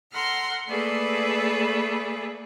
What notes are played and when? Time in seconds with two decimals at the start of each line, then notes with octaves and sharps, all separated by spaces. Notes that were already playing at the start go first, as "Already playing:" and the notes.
0.12 A4 F#5 A#5 C6 F6
0.67 A3 A#3 G#4 A4 B4 D5